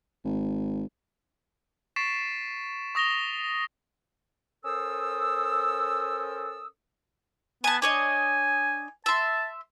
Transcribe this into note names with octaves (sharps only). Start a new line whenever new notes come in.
G#1
C#6 A6 B6 C7 D7 E7
C#6 D#6 A#6 F7 G7
C#4 A4 A#4 C5 D#6 E6
B3 G#5 A5
D4 C#5 D#5 G#5
E5 A5 C6